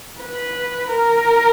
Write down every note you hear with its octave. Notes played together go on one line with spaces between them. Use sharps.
B4
A#4